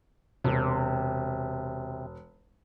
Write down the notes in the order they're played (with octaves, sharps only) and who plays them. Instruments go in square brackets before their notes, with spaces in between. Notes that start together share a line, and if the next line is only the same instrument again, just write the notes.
[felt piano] E1 [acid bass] C3